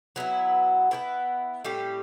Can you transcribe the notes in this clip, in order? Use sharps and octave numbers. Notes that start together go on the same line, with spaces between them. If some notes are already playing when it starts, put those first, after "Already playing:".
F#3 B3 E4
B3 E4 G4 B4
A2 G3 C4 G4